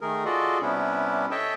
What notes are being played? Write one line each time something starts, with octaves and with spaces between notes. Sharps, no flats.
D#3 A3 G#4 A#4
F4 F#4 G#4 A4 D5 D#5
C3 G3 B3 C#4 D4 E4
A4 C#5 D#5 E5 G5 A5